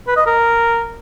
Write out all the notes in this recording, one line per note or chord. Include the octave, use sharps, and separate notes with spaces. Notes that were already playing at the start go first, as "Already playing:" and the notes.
B4
D#5
A#4